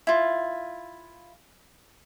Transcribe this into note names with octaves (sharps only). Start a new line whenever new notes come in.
E4 F4